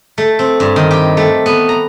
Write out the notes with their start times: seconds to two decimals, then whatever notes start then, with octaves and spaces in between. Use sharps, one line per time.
0.18 A3
0.39 C4
0.60 G2
0.76 D#3
0.91 G4
1.17 A3
1.46 B3
1.69 A#5